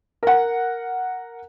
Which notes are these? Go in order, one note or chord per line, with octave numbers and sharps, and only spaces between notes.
A#4 F#5